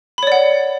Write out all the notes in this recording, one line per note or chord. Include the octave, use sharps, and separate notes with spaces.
C#5 D5 F#5 B5